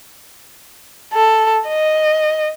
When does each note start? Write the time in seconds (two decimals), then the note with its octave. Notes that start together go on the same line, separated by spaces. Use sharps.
1.14 A4
1.68 D#5